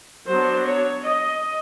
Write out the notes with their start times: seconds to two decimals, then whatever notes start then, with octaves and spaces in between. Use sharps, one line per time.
0.27 F#3 B3 D4 C5
0.65 C#5
1.02 D#5